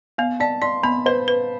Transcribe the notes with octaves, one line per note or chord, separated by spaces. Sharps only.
B3 F5
D5 A5
D5 C6
B3 B5
B4 C5
B4